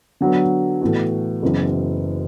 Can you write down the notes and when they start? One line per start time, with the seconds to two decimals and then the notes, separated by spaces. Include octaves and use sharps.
0.21 D3 F#3 B3
0.81 A2 E3 B3 F#4
1.42 F#1 F#2 E3 B3